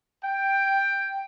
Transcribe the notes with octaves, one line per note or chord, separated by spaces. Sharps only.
G5